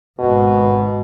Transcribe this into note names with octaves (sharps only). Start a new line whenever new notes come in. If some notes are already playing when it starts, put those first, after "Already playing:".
G#1 G#2 B2